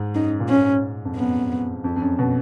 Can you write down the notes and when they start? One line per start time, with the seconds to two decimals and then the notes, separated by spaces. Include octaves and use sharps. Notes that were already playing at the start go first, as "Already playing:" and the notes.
Already playing: G#2
0.15 F#2 D#4
0.40 A#2
0.49 G#2 C#4
1.05 F2
1.16 F#2 B3
1.84 F2
1.96 F2
2.01 F#2
2.19 B2